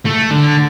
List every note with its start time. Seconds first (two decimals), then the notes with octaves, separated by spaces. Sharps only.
0.05 A3
0.30 D3